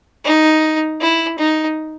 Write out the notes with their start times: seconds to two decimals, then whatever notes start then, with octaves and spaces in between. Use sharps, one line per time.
0.24 D#4
1.00 E4
1.38 D#4